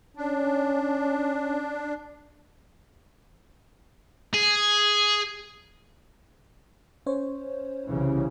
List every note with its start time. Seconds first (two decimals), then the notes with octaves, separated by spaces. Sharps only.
0.17 C#4 D4
4.34 G#4
7.06 C#4 C5 C#5
7.85 C2 C#3 E3